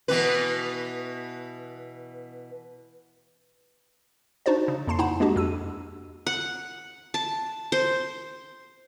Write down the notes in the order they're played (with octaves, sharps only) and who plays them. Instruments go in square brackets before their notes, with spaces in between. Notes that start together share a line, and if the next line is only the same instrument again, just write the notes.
[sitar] B2 E3 B4
[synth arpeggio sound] D4 D#4 F#4 C5 D5
C#3
F2 A#3 A5 C6 C7
D#4 E4 F#5 A5 B5
G#3 A#3 D4 F#4 G4
F2 E6 D#7
[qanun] F#5
A5
C5